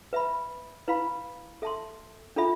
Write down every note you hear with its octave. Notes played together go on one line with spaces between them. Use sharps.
B4 E5 B5
E4 B4 F5 B5
A4 E5 A5 C6
D4 F4 A4 E5 B5